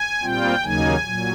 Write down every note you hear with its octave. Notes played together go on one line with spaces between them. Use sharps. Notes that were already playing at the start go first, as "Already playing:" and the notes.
Already playing: G#5
A#2 G3 C4 F4 G5
D#2 C#3 F#3 A#3 D#4 G#5
A#2 F#3